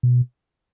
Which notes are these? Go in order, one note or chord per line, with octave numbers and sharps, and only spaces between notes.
B2